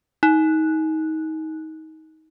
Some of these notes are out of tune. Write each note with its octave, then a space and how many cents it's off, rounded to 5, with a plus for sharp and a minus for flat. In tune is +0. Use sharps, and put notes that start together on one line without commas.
D#4 +25